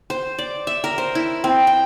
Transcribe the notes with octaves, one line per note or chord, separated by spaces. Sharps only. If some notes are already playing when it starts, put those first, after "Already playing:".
C5
D5
E5
A#4
C5
E4
C4
G5